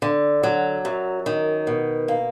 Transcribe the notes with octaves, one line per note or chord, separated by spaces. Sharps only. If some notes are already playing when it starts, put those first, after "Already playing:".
D3
F#3
F#2
D#3
B2
A#3